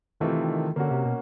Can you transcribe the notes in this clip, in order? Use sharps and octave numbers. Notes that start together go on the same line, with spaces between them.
C3 D#3 E3 A3 C4 F4
D3 A#3 C#4 F#4
C3
B2